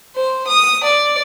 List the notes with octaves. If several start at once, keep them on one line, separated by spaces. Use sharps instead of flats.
C5
D#6
D5